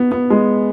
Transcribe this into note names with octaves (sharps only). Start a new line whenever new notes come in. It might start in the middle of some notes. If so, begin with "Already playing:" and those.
Already playing: B3
B3
G#3